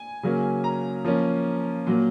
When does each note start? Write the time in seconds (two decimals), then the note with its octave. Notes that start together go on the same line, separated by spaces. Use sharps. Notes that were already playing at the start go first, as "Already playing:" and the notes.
Already playing: G#5
0.23 C#3 F#3 A#3 C#4
0.64 A#5
1.05 F3 A#3 C#4
1.86 A#2 F#3 A#3